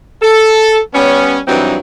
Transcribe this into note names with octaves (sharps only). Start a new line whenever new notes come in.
A4
G3 B3 C#4
G2 E3 F#3 C4 D#4